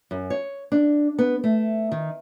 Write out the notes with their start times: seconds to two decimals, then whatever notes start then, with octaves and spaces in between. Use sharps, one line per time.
0.11 F#2
0.30 C#5
0.72 D4
1.19 B3
1.44 A3
1.92 D#3